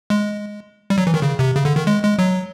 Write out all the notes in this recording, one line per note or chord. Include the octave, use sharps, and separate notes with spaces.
G#3
G3
F#3
E3
D#3
C#3
C3
C#3
D3
D#3
G#3
G#3
F#3